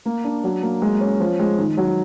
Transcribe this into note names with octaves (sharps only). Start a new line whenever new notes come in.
A#3
D4
F#3
A#3
G#3
C#4
F3
G#3
D#3
F#3